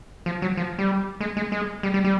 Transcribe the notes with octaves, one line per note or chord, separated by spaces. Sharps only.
F3
F#3
F3
G3
G#3
G#3
G#3
G3
G3
G3